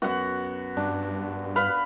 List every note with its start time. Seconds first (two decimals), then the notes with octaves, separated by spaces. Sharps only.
0.02 F#2 B3 F#4 F#5
0.77 G2 D4
1.56 B4 F5